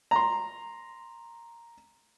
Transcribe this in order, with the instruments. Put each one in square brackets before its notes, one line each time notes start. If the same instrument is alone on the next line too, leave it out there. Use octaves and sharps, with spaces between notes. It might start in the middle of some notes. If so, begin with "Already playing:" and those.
[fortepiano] A#5 C6